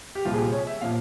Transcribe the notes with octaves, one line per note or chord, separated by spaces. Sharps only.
G4
C2 A#2 F3 F4
G#4
G4
C#5
E5
A#2 F3 F5